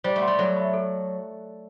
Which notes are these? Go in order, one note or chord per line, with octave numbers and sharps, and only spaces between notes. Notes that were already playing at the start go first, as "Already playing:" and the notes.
G3 C5
A3
F#5 C6
G3
F#3 A4
E5 B5
A4